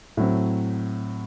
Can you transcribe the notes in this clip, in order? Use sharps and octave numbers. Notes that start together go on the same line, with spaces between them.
A2 F#3 C4